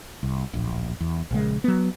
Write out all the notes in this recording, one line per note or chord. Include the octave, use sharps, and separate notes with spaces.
C2
D1 A#1
E2
A#1 C#3 G#3
F#3 B3